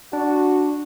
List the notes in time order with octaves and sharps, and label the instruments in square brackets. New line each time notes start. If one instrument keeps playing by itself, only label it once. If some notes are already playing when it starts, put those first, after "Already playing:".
[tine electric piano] D4 [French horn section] F#4